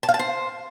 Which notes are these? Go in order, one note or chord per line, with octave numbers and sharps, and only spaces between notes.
A5
F5
A5
C5